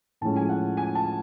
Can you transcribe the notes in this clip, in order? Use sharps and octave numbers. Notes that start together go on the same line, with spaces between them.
A2 F3 G#3 C#4 A5
G#5
F#5
G#5
A5